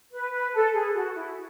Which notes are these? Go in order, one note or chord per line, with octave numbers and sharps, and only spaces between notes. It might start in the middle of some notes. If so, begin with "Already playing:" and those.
B4
B4
A4
G#4
F#4
E4